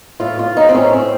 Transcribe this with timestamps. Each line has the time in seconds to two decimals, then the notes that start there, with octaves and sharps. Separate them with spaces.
0.20 A2 F4
0.39 F4
0.57 D#4
0.69 C4
0.75 A2 C#4
0.93 C4